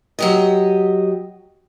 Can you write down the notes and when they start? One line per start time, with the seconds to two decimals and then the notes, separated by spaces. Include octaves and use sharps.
0.19 F#3 G4 D#5